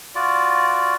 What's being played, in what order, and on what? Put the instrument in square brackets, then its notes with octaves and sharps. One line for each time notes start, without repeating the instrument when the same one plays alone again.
[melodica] F4 F#4 D5